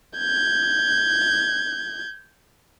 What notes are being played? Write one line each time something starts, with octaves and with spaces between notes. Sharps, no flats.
G6 G#6